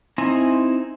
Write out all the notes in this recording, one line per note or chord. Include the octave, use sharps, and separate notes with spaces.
C4 D#4 E4 G#5 A#5